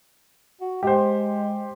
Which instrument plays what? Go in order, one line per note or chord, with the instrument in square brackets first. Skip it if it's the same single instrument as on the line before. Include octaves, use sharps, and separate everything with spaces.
[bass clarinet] F#4
[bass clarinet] G#3 [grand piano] G4 C5